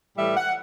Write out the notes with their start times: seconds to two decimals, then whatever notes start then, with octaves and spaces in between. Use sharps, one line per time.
0.16 A2 E3 G3 E5
0.36 F#5